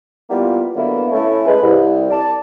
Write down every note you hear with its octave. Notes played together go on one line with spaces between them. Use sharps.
G3 A#3 B3 E4 F4
D3 F#3 A#3 B3 E4
A3 C#4 E4
G#3 B4
C2
D5 A5